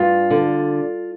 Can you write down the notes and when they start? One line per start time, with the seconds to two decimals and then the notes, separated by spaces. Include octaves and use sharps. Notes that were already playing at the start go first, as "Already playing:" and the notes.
Already playing: G2 F4
0.30 D3